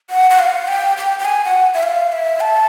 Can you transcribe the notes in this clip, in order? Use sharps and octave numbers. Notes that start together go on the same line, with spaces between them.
F#5
F#5
F5
G5
G5
G5
G#5
F#5
E5
F5
E5
A5